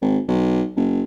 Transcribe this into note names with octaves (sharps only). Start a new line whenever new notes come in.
G#1
B1
F#1